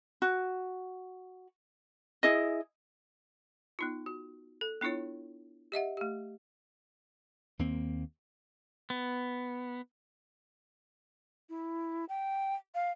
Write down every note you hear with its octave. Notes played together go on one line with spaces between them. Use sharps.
F#4
E4 G#4 D#5
B3 D#4 F4
F#4
A4
B3 D4 E4 F4 C#5
G4 D#5 E5 F#5
A3 G4
D#2 A#3 C4
B3
E4
G5
F5